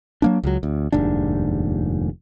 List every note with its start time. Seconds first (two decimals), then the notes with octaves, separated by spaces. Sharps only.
0.22 F#3 A#3 D4
0.43 C#2 F#3
0.63 D2
0.92 F1 D#2 G#2 D4